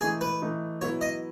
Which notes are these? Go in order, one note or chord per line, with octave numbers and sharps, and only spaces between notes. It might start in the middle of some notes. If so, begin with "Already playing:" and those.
E3 A3 D#4 G#4
B4
E3 A3 D#4
F#3 B3 E4 C#5
D#5